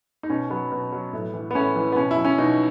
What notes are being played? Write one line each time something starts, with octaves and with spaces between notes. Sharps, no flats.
D#4
B2 C#4
F#3 B3
B2
F#3
A2
E3
B3
A2 C#4
E3
B3
B2 C#4
E4
F#3
C#4
B2 D#4